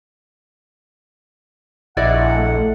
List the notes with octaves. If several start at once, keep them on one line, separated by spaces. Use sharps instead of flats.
A#1 E4 D5 D#5 F#5
A3